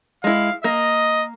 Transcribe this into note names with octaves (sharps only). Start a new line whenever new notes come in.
G#3 E4 F5
A#3 D#5